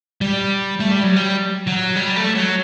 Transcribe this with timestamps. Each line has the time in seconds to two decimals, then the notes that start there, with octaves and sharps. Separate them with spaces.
0.21 G3
0.80 A3
0.92 G3
1.04 F#3
1.16 G3
1.67 F#3
1.96 G3
2.16 A3
2.35 F#3